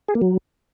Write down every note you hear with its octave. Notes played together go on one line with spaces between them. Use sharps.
G#4
A#3
F#3